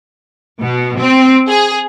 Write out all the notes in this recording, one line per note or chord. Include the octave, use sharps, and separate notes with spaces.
B2
C4
G#4